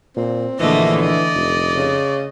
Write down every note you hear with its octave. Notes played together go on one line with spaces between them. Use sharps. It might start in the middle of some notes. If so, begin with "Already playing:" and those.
A#2 C4
A#1 D3 E3 A3 A#3 D#5
D5 D#5
F1
C#3